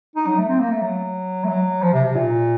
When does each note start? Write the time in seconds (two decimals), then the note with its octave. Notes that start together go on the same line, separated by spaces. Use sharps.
0.16 D#4
0.27 F#3
0.38 A3
0.49 C4
0.60 A#3
0.72 A3
0.82 F#3
1.44 A3
1.49 F#3
1.82 F3
1.93 C3
2.05 C3
2.16 A#2